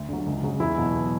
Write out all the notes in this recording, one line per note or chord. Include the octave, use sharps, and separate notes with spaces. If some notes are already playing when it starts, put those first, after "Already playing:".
Already playing: D2
D3 F#3
C#2
C#3 F#3
E2 E4
B2 F#3